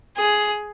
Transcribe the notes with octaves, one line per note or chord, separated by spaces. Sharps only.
G#4